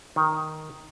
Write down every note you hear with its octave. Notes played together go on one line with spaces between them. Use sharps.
D#3